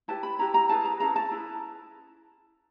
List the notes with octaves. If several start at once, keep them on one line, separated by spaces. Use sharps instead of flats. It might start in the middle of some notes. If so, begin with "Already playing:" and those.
E4 G4 B4 A5
B5
E4 G4 B4 A#5
A#5
E4 G#4 B4 A5
A#5
C#4 E4 G#4 A#5
A5
E4 G#4 B4